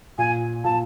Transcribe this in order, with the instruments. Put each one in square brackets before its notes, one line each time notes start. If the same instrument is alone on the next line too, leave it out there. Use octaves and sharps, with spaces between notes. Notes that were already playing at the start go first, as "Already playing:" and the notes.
[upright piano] A#2 [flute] G#5
[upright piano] A#2 [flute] A5